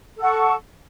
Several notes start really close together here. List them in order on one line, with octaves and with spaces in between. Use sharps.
A4 F#5 C#6 A5